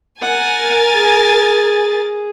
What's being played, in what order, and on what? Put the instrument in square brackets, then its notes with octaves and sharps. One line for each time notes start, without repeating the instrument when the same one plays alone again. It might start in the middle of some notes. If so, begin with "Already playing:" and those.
[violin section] A#4 G#5 A6 [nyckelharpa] F#5
[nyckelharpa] G#4